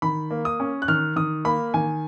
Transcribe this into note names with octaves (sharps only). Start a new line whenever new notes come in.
D#3 B5
A#3
D#6
C#4
F#6
D#3 F6
D#3 D#6
A#3 B5
D#3 G#5